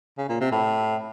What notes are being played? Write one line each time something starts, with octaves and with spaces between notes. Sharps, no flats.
C#3
A#2
C3
A2